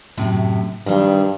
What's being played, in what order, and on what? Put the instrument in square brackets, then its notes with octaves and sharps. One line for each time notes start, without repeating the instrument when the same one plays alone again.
[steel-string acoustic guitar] F#2 A2 C3
[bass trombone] G2 [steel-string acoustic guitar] D#3 G3 D4